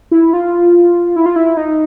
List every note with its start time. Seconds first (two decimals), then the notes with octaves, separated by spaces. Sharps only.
0.11 E4
0.33 F4
1.16 E4
1.26 F4
1.36 E4
1.57 D#4